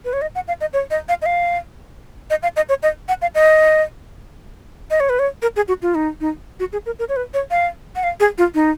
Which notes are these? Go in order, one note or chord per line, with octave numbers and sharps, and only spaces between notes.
B4
C#5
D#5
F#5
F5
D#5
C#5
D#5
F5
D#5
F5
D#5
F5
D#5
C#5
D#5
F#5
F5
D#5
D#5
C#5
B4
C#5
A#4
G#4
F#4
F4
D#4
D#4
F#4
G#4
A#4
A#4
C#5
B4
C#5
F5
F#5
F5
G#4
F4
D#4